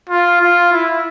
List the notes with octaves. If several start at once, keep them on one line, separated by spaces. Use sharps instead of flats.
F4
F4
E4